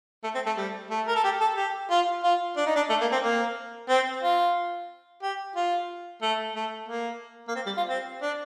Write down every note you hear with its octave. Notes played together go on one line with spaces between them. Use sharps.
A3
C4
A3
G3
A3
A#4
A4
G4
A4
G4
F4
F4
D4
D#4
D4
A3
A#3
C4
A#3
C4
F4
G4
F4
A3
A3
A#3
A#3
C4
G3
F4
C4
D4